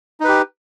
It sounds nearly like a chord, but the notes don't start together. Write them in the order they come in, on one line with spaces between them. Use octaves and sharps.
D#4 B4 G4